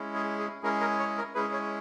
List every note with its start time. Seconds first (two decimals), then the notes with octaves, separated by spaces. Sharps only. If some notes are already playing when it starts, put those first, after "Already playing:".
Already playing: G#3 C#4 E4
0.15 G#4
0.39 G#4
0.63 G#3 C#4 E4 G#4 A#4
0.80 A#4
0.99 C#5
1.18 A#4
1.35 G#3 C#4 E4 G#4 B4
1.53 C#5